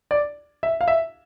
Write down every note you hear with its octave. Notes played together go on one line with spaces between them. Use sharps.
D5
E5
F5
E5